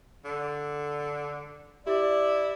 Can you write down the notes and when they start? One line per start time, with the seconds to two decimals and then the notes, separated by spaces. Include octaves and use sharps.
0.25 D3
1.86 E4 G4 D5